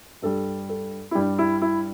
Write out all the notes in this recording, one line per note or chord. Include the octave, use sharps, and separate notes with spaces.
G2 G3 A4
A4
E4
G2 G3 G4
E4
E4